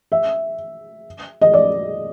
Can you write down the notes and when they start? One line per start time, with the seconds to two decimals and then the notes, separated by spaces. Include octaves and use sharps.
0.12 E5
1.41 D#5
1.54 D5